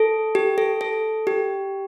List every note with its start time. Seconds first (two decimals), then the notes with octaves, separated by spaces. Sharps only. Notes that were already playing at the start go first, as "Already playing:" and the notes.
Already playing: A4
0.35 G4
0.58 A4
0.81 A4
1.27 G4